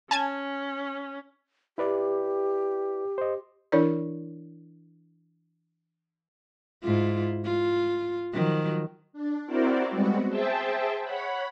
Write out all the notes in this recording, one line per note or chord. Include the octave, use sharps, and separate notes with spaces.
C#4 G#5 A5 G#6
E4 G4 B4 D5
C5 D#5
E3 D4 E4 A#4 C#5 D5
G#2 E4 F4
F4
D#3 F3 F#3
D4
C4 E4 F#4 A#4 C5 D5
G3 G#3 B3 C4 F#4
G#4 C5 E5 G5 A5
C#5 F#5 B5